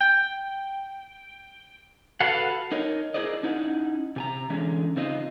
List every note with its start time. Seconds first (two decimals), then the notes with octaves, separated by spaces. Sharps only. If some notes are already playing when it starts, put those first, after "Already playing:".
0.01 G5
2.21 F#4 A4 B4 F5 F#5
2.72 D#4 A#4 C#5 D#5
3.14 E4 G#4 A#4 C5 D5 D#5
3.43 C#4 D#4 E4 F#5
4.16 C3 G#5 A#5
4.50 D3 E3 G#3 C#4
4.96 C#3 C4 D#4 F4 D#5